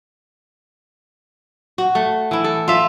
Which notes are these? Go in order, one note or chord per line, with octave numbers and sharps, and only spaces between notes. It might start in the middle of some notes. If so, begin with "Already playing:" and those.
F#4
A3
E3 E4
A4
F4 E5